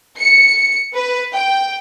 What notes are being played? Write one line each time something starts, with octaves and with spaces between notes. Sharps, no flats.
C#7
B4
G5